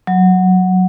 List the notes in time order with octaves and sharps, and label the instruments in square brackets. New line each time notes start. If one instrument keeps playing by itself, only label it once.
[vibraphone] F#3